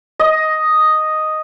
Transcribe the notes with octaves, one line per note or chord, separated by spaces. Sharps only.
D#5